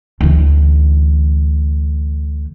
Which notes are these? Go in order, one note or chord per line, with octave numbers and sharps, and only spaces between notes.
D2 E3